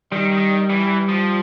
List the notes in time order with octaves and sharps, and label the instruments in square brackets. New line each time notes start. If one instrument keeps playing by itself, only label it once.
[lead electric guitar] D#3 [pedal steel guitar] G3
[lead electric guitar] D#3
E3
F3